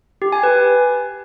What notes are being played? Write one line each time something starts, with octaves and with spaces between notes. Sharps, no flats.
G4
G#5
B4